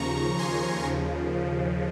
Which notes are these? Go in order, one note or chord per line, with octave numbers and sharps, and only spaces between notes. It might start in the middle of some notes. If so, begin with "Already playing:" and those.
Already playing: D#2 C#3 F3 A#5 C#6
G#5 C6
D#2 C#3 F3